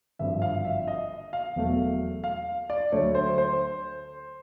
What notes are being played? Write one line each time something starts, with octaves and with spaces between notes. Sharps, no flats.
G#1 G2 D3 F3 E5
F5
E5
D#5
F5
E1 E2 B2 F#3 A3
F5
D5
D2 D3 F#3 A3 C#5
C5
C5